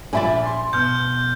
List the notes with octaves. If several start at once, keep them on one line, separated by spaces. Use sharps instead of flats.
A#1 D5 E5 G#5 B5 A6
C6
B2 F6 G6